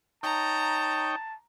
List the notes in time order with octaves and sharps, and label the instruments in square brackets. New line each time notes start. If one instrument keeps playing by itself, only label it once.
[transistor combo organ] D#4 C#5 G5 [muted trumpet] A5 [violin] A#5